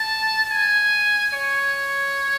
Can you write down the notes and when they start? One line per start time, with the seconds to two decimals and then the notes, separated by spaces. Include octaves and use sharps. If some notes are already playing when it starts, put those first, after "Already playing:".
Already playing: A5
0.51 G#5
1.34 C#5